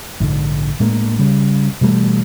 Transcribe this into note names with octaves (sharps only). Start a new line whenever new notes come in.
A#1 G#2 D3
A2 G#3 A#3 D4
C#3 G3
B2 E3 G3 A3